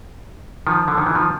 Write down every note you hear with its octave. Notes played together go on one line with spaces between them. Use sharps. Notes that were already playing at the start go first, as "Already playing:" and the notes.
D#3 F3
D3
D#3
E3
D#3 F3